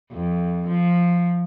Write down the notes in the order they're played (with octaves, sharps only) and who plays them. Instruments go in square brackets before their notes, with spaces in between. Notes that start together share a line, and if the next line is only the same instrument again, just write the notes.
[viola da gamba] F2
F3